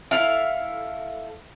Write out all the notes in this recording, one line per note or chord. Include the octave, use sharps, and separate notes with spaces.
E4 A4 F5